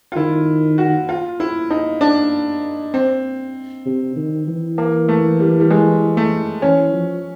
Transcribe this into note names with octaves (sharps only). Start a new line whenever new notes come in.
F4
D#3 E4
F#4
F4
E4
D#4
D4
C4
C3
D#3
E3
A#3
A3
G3
G3
G#3
A3
E3 C#4
F3